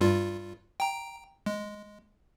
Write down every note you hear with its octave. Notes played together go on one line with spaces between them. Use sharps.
G2 G3 F4
G5 A#5
G#3